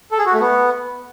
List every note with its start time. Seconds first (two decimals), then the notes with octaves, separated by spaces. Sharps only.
0.11 A4
0.19 G#4
0.26 F#4
0.33 A3
0.40 B3